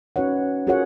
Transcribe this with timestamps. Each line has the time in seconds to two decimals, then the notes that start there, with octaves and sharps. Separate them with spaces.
0.16 C#4 D#4 F#4 B4 C#5 F#5
0.67 F4 F#4 G#4 A#4 C#5 F#5